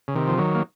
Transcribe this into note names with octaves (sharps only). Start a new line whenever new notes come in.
C#3
C3 D#3
F3
D#3 F#3
A#3